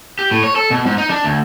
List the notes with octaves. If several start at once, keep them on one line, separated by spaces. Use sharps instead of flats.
G4
A2
C#5
A4
B2
G#2
D#4
D4
D2